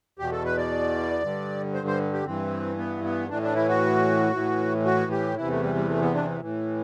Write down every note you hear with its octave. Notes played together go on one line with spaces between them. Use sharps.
E2 B2 G4
A4
B4
D5
G2 D3
C5
C5
G4
G2 E3 C4
B3
B3
A2 E3 D4
D4
E4
F#4
A2 E3
F#4
G4
E2 C3 E3 E4
A3
G3
G3
A3
B3
D4
A2 E3